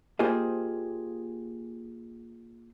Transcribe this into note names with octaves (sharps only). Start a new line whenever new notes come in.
A#3 F4 G4 G#4 C5 D#5